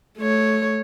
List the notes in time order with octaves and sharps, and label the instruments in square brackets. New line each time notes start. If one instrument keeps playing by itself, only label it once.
[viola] A3 C#5